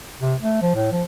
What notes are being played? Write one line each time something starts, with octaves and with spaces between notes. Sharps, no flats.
C3
A3
F3
A2
F3